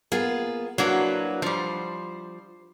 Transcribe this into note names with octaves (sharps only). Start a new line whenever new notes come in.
A#3 B3 F4 G#4
F#3 A#3 D4 E4 F#4 B4
F3 G3 C5